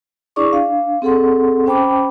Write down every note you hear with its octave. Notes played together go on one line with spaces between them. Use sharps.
D4 E4 G#4 D5 C#6 D6
D4 F5
C4 G#4 A4 F#5 C6
C#4 C5 G5 A5 B5 D6